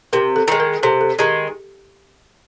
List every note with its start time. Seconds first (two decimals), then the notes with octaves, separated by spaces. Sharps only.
0.13 C3 A#4
0.36 A4
0.48 D#3 G#3
0.60 A#4
0.83 C3 A4
1.01 A4
1.19 D#3 G#3 G4